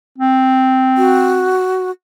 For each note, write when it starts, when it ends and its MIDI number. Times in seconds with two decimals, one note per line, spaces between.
0.18 1.60 60
0.98 1.91 66